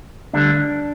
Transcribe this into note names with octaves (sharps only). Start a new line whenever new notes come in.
D2 D3 G3 D4